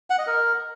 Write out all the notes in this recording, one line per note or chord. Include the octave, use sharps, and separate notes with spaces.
F#5
D#5
A#4